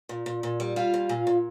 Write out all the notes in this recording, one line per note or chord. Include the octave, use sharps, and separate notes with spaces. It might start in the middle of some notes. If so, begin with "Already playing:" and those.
A#2
A#2
A#2
G3
G3 F4 F5
A#2
A#2
A#2